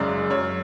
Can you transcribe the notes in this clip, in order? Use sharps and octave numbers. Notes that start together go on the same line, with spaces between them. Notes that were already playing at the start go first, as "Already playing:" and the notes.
Already playing: F#1 F#2 C#3 G#3 D5
F#2 C#5